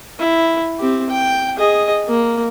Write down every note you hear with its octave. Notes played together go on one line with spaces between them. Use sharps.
E4
C4 G4
G5
G#4 D#5
A#3